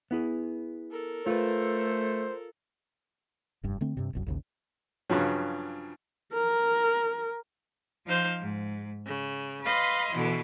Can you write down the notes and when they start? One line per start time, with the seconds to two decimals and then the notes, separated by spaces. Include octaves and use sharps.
0.11 B3 E4 G#4
0.91 A4 A#4
1.27 A3 F4 B4 C5
3.64 F1 G2
3.81 D3 A3 C4
3.97 G2 C3
4.13 E1 C2 F#2
4.27 A1 D#2 C#3
5.09 G2 C#3 F3 F#3
6.33 A#4
8.06 F3 D#4 C5 F5 G6
8.40 G#2
9.04 C#3
9.63 B4 D#5 F5 B5 C6
10.13 B2 D3 E3